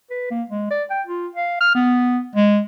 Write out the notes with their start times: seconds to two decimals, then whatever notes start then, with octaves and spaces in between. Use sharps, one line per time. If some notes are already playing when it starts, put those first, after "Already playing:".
0.10 B4
0.31 A#3
0.50 G#3
0.70 D5
0.90 G5
1.07 F4
1.35 F5
1.61 F6
1.75 B3
2.36 G#3